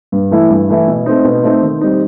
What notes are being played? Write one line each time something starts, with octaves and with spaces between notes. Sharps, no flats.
G2
E3 A3 E4
G2
E3 A3 E4
B2
A3 C4 D#4
B2
A3 C4 D#4
D#3
G3 C4 D#4